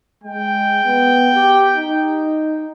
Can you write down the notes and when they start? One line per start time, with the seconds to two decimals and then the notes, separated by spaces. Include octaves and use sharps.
0.24 G#3 G5
0.85 B3
1.34 G4
1.76 D#4